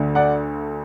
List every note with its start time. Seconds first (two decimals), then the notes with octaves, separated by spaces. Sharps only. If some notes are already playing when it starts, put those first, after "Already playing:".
Already playing: D2 D3 A3
0.15 D5 F#5